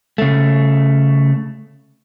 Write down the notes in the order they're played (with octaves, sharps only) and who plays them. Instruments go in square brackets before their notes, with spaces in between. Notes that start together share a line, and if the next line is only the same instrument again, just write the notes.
[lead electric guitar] C#3 A3